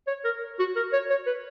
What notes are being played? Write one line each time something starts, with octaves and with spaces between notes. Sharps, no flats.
C#5
A#4
F#4
A#4
C#5
C#5
B4